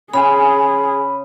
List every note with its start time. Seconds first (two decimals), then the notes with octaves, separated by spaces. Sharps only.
0.13 C#3 G#4 G#5 B5 C6